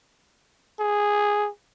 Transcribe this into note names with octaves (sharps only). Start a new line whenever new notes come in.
G#4